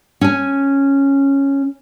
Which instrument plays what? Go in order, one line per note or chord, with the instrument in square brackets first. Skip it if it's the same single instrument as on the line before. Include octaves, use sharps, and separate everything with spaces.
[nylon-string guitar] C#4 G#5